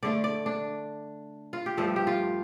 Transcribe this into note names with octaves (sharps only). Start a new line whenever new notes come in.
D3 A3 D4 D5
D5
D4
F4
G4
G2 F3 A3 A4
G4
F4